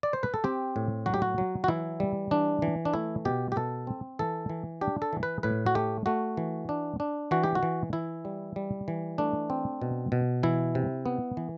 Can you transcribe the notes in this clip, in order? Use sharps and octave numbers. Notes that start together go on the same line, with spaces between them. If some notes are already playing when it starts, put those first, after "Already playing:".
D5
C5
B4
A4
C4 G4
A2
F#3 F#4
G4
F#4
F#3
F#4
E3 E4
G3
E3 D4
E3
D4
A3 E4
B2 G4
G4
B2 A4
C4
E3 A4
E3
D4 G4
A4
E3
B4
A2 B4
F#4
A3 G4
A3 F#4
E3
D4
D4
E3 F#4
G4
F#4
E3
E3 E4
G3
G3
E3
A3 D4
C4
B2
B2
E3 E4
C3
B3
E3